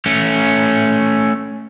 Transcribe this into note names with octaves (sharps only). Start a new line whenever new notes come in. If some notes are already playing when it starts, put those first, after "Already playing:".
A3 C#4